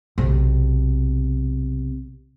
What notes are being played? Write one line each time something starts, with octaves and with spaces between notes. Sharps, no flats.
B1 C3